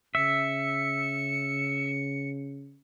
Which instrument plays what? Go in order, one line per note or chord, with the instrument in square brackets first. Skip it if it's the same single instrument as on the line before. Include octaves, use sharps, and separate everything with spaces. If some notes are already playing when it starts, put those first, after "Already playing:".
[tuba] C#3 [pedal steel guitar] E5 [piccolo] C#7